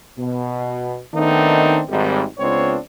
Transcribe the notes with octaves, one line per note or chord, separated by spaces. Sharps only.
B2
D#3 A3 B3 C4 D4 D#4
G#1 G#2 G3
C#2 B3 C4 D4 F4 C#5